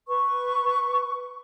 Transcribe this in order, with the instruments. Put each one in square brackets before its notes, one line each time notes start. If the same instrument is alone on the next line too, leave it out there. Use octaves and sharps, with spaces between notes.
[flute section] B4 C#6